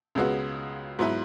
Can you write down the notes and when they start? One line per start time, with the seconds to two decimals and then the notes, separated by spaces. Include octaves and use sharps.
0.15 C#2 C#3 G#3 B3 F#4
0.99 G#2 F#3 B3 E4 B4